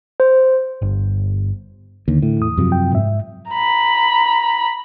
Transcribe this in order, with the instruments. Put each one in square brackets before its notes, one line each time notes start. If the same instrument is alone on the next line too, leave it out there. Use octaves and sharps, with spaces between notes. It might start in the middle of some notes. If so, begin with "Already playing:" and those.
[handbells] C5
[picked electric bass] G1
[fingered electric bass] D#2 [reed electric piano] D3
[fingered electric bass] A2
[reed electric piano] E2 D#6
[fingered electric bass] F#2 C3 F3
[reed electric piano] G5
G#2 E5
[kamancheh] A#5 B5